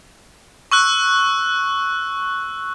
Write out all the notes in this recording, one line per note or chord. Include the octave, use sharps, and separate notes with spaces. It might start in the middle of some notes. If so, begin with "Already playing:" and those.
C#6 E6 F#6